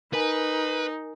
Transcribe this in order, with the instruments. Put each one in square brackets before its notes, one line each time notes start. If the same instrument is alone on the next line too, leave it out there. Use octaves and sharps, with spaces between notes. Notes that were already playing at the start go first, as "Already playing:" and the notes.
[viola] D#4 [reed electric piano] A#4 G#5 [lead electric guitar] B4